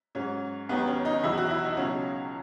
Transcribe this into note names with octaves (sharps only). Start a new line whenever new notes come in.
G#2 F#3 C#4
D#2 D#3 F#3 B3
C#4
D#4
E2 B2 F#3 E4
F#4
E4
D#4
C#2 B2 F#3 C#4